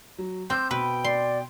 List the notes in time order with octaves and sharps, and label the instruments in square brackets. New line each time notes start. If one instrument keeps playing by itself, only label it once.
[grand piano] F#3
[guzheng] C4 [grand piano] C6 D6 E6 [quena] G6
[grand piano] B2 [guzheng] B4 [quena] G5
[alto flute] D5 [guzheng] C6